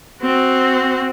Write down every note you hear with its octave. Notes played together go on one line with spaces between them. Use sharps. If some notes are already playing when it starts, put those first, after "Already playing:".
C4 F#4